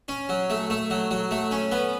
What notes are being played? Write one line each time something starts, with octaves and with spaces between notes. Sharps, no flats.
C#4
F#3
A3
A3
F#3
F#3
A3
C#4
B3